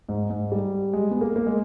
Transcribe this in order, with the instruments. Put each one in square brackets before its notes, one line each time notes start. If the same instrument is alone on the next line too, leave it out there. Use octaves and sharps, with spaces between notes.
[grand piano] G#2
G#2
G3
G#3
B3
A#3
A#3
G#3